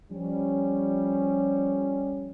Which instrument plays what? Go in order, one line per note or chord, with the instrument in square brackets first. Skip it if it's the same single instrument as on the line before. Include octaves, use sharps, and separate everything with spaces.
[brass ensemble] F3 G3 C#4